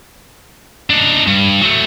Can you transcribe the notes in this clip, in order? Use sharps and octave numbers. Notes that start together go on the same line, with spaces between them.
D4 D#4
G2
F#3 A3